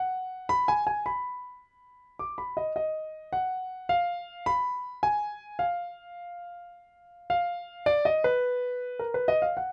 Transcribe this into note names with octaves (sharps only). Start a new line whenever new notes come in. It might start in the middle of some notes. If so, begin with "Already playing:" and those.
Already playing: F#5
B5
G#5
G#5
B5
D6
B5
D#5
D#5
F#5
F5
B5
G#5
F5
F5
D5
D#5
B4
A#4
B4
D#5
F5
F#5